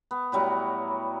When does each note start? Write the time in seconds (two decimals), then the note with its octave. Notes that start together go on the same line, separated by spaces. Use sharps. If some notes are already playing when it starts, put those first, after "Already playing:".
0.11 B3
0.32 A2 F#3 G3 B3